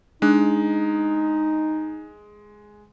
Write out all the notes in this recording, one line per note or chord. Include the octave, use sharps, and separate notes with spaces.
G#3 D4 D#4 F#6